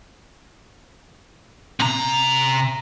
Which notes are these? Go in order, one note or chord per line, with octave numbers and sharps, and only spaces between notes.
C3 A#5